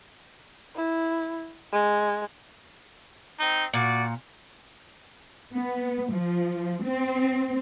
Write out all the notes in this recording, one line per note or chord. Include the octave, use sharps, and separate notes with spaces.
E4
G#3
C4 D#4
A#2 F#4 D5
B3
F3
C4